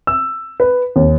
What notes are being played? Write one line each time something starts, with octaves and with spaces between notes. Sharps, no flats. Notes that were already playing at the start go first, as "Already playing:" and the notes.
E6
B4
D#2